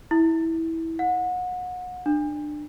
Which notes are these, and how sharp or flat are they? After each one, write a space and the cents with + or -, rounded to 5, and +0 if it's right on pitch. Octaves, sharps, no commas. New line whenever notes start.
E4 -15
F#5 -30
D4 +25